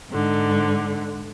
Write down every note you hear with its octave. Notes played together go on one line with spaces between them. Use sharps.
G#2 D3